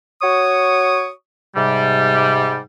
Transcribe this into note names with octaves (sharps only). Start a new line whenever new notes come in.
F#4 C#5 C#6 D#6
G#2 C3 G3